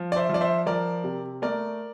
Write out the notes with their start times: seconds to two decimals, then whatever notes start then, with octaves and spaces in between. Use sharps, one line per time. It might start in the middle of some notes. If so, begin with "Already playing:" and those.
Already playing: F3
0.12 D5
0.16 C5 E5
0.29 F3 D5
0.41 C5 E5
0.66 F3 A#4 D5
1.04 C3
1.42 A3 A#4 D5